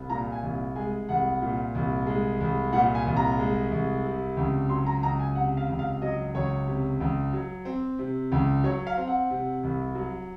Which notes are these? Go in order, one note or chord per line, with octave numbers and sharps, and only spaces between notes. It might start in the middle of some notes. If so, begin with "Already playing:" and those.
Already playing: C2
A#2 A#5
G#5
C2
G#3 G#5
C2 F#5
A#2
C2
G#3
C2
A#2 F#5
G#5
C2
A#5
G#3
C2
C3
C#2
F#3 C6
A#5
C#2 A#5
G#5
C3 F#5
F5
C#2
F5
F#3 D#5
C#2 C#5
C3
C#2
F#3
C4
C3
C#2
F#3 C#5
F5
C4
F#5
C3
C2
F#3